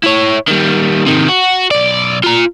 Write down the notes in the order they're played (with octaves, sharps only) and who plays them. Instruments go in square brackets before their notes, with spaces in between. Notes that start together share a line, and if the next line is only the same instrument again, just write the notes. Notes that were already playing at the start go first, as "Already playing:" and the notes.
[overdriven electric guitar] E4 C#5
D#3 G3
C3 D#3
F#4
B1 D5
F4 A#5